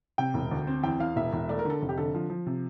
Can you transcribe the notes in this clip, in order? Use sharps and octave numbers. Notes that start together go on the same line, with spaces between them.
C3 G5
E1
D2
C4
E2 G5
E2 F5
E1 E5
E1
A3 D5
A#4
D3 A4
F1
G4
D3 A4
F3
F3
C3